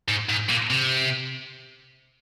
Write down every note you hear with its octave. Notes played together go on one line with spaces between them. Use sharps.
G#2
G#2
A#2
C3